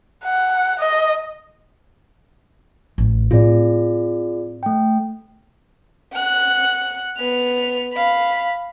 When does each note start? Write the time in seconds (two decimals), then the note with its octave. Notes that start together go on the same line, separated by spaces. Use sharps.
0.24 F#5
0.79 D#5
2.98 A1
3.31 A2 C4 F4 G#4 D5
4.63 A3 G5
6.13 F#5 F#6
7.17 B3 F7
7.94 F5 B5